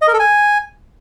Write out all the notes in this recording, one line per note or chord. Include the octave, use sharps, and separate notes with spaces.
D#5
A#4
A4
G#5